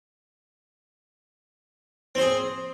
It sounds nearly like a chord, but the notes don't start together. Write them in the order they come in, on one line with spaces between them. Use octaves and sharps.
C4 C5 G#4